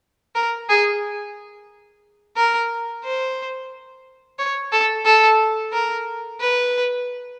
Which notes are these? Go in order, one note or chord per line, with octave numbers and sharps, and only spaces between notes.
A#4
G#4
A#4
C5
C#5
A4
A4
A#4
B4